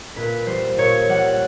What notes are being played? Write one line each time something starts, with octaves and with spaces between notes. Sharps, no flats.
A#2 B4
G3 C5
A#2 C#5
G3 F#5